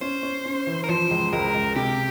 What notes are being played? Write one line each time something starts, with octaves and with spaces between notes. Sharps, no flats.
C#4 C5
C#4
C#4
E3
A#4
F3 C5
C#2
C#2 A#4
C#2
C3 G4